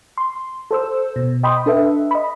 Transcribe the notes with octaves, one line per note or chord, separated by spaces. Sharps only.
C6
A4 C5 E6
B2
D#5 G5 B5 C6 D#6
D4 A4 B4 E5
D#5 B5